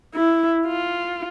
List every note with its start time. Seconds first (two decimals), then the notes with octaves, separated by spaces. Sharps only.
0.15 E4
0.67 F4